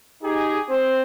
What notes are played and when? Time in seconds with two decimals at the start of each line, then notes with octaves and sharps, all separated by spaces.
0.23 D#4 G4 G#4
0.69 C4 C5